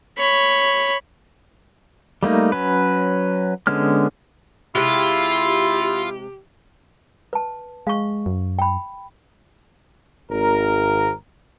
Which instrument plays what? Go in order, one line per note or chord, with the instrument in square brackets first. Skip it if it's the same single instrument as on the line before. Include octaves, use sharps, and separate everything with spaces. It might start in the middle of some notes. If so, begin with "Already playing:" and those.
[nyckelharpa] C#5 B5
[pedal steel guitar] G3 A3 A#3 D#4
F#3 C#4 B4
D3 G#3 B3 C#4 F6
[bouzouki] C3 G#3 [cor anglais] E4 [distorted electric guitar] F4 [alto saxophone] G4
[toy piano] B4 A5
[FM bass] G#3 [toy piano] F5 C#6
[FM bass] F#2
[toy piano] G5 B5
[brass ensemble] G#1 A#4